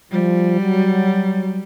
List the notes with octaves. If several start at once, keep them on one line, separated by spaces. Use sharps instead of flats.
F3 G3
F#3